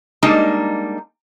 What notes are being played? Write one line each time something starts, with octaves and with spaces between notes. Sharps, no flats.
G3 G#3 A#3 D4 D#4